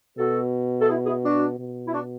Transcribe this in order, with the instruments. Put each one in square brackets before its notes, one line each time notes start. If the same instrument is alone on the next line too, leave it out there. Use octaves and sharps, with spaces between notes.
[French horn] B2 [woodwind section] F#4 A4
[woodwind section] A4
E4 G#4
E4 G#4
D4 F#4
[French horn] B2
[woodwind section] E4
D4 F#4